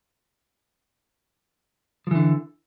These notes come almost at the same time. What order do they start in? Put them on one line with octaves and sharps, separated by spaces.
F3 E3 D3